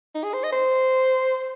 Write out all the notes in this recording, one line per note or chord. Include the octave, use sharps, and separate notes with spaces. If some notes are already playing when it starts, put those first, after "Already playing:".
D#4
G#4
C5
D#5
C5